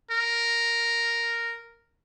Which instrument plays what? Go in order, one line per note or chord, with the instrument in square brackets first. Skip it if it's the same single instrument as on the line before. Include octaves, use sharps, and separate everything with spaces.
[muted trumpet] A#4